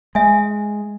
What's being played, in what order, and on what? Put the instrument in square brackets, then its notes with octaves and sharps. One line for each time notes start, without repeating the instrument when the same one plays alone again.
[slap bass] G#3 [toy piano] E5 G#5